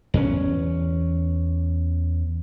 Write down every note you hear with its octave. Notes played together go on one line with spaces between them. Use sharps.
E2 C#4